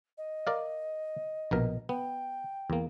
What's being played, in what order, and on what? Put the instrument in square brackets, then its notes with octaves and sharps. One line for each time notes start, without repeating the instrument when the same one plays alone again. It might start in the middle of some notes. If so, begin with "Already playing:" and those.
[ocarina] D#5
[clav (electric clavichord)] A#4 D5 F5
A#1 B2 A#4
[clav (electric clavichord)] B3 [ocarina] G5
[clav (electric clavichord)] E2 A#3